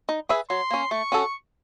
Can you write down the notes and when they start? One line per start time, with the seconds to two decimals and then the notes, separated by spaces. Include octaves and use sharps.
0.09 D#4
0.29 G#4 B4 E5
0.50 F#3 C6
0.71 A#3 C#4
0.91 A3 C#6
1.12 C#4 F#4 A4